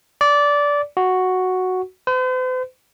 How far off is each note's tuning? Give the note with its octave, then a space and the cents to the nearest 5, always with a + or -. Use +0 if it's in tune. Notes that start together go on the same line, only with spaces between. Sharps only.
D5 -15
F#4 +0
C5 -45